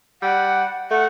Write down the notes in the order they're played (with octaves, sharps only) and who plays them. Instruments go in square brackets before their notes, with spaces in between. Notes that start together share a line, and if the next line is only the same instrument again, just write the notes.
[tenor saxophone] G3 [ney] F#5
[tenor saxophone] A3 [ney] F#5